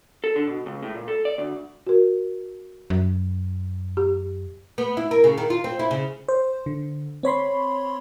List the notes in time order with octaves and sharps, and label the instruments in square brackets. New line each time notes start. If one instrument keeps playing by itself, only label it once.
[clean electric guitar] A4
D3
B2
C#2
A2
A#2
A4
D5
D2
[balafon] F#4 A#4
[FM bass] F#2
[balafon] G4
[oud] B3
E4
A#4
C#3
D#3
F4
C4
E4
C#3
[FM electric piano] C5
D3
C4 C#5 B5 C6